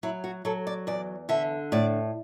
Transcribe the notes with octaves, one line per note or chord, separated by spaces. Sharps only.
F#3 E4
F#4
F#3 A4
D5
E2 D5
D3 E5
A2 D5